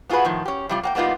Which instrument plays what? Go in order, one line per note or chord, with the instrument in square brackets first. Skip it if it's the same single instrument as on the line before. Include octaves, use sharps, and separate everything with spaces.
[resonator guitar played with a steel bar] B3 F4 F#4 G#4 B4
A2 D#3 F3
C#4 G4
C3 G3 F4
A#3 F#5 G5
G3 A#3 B3 D#4 F4